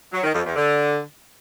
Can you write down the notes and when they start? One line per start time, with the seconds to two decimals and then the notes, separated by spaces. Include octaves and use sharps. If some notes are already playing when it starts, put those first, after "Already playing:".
0.13 F#3
0.24 D#3
0.35 F2
0.45 E2
0.56 D3